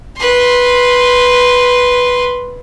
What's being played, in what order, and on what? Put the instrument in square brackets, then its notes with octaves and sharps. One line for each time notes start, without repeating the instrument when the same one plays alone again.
[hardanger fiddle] B4 C6